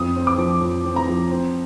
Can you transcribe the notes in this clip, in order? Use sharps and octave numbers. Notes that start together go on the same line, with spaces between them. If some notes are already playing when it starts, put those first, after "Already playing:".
Already playing: F2 D#6
C4
D6
F3
F2
C4
A#5
F3
C4